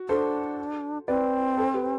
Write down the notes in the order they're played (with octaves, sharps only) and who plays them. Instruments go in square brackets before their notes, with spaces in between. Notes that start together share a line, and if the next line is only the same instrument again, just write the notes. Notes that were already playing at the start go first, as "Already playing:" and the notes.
Already playing: [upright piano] F#4
[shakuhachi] D4 [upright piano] A4 C5
[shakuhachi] C4 [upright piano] B4 D5
[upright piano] A4 C5
G4 B4